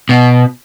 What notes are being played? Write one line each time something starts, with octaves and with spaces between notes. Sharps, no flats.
B2